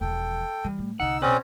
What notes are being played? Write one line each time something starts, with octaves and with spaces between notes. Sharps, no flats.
E1 F3 A4 G5
E3 G3
A2
C2 D3 D#4 F#5 E6
B2 C4 C#4 G#4 B4 D5 D#6